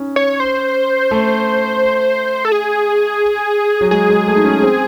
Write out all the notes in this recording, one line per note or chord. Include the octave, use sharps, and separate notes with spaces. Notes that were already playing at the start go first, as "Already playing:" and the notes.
Already playing: C#4 D#4
C#5
C5
A3
A4
G#4
F#3
G#3 G#4
G#3
A3
D#4
C#4
C4